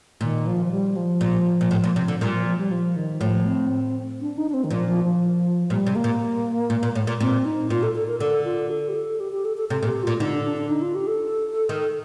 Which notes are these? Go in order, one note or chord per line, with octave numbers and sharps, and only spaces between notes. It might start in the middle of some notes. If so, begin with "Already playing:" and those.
A#2 D#3
F3
F3
G3
F3
A#2
A#2
A2
A#2
C3
D3
A#2 G3
F3
F3
G3
F3
D#3
A2 F3
C4
D4
D#4
D4
C4
D#3
A#2 F3
F3
F3
A#2 G3
C3
A#3
A#2
A#2
A#2
A2
A#2
A#2 C4
D#4
A#2 F4
A4
A4
A#4
D3 A4
F4
A4
G4
A4
G4
G4
A4
A4
C3 A4
A#2
G4
A#2 F4
D3 D#4
D4
D4
D4
D#4
F4
G4
A4
D#3